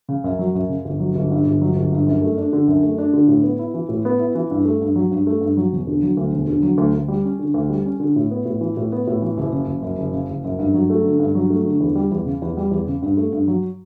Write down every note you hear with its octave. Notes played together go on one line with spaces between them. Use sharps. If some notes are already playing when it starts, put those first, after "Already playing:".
C#3
F#2
F#3
F#2
C#3
G1
F#3
G1
G2
G1
F#3
G1
G2
F#2
A3
D4
D3
F#2
A3
D4
D3
A2
B3
E4
E3
A2
B3
E4
E3
G2
A3
G2
F#3
G2
A3
G2
F#3
E1
D3
F#3
D2
E1
D3
F#3
D2
D2
G3
C#4
D3
D2
G3
C#4
D3
A2
B3
A2
E3
A2
B3
A2
E3
F#1
C#3
F#1
F#2
F#1
C#3
F#1
F#2
G2
F#3
A3
D3
G2
F#3
A3
D3
E2
G3
E2
C#3
E2
G3
E2
C#3
G2
A3
G2
F#3